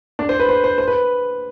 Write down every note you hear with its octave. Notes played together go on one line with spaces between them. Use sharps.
D4
C5
B4
C5
C5
C5
B4